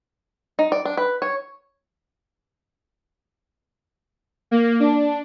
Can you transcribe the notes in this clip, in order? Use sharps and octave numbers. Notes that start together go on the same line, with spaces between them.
D#4
D5
D4
B4
C#5
A#3
D4